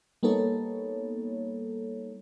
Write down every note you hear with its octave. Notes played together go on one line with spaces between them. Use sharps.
G3 A#3 B3 D#4 A4 C#5